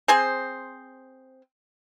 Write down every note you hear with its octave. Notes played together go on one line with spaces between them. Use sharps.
C4 G#4 C5